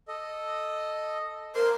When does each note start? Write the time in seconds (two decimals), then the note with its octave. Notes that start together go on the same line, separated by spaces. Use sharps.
0.08 A4 D#5
1.55 A#4 C5 C6